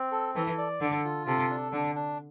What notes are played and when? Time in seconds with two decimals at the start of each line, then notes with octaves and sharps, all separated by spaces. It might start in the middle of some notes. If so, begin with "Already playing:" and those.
Already playing: C4
0.12 A4
0.35 E3 A4
0.58 D5
0.80 D3 A4
1.04 F4
1.26 C3 A4
1.50 D4
1.72 D3 D4
1.95 D4